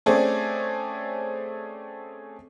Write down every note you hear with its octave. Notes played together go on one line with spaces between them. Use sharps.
A3 C4 C#4 G#4 D5